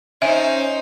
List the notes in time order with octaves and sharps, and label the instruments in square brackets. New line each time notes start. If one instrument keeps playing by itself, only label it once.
[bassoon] C#4 [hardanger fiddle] D#4 C5 [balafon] E5